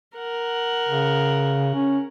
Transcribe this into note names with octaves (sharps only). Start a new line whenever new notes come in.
A#4 F#5
C#3
C#4